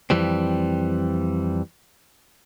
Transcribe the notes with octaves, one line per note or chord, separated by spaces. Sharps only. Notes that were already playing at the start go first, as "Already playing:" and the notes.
F2 E3 G3 C4